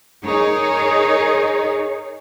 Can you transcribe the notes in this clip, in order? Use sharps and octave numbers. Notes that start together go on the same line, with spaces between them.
D#4 G#4 A#4 C#5